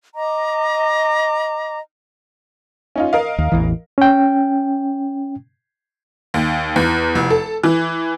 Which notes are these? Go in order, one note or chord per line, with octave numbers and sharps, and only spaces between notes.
D#5 A#5 D6
C#4 D#4 F4
A#4 D#5 F5
D#2
A1 E2 E3
C#4 G5
D#2
E2
F1
A4
E3